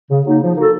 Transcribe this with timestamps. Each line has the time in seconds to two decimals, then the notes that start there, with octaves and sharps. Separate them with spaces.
0.11 C#3
0.26 F#3 A#3 D#4
0.43 F3
0.57 A#3 D#4 F#4 A4